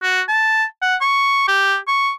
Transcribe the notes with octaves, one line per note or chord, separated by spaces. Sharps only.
F#4
A5
F#5
C#6
G4
C#6